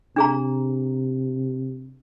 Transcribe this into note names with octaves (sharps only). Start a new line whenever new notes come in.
C3 D4 G#4 A#5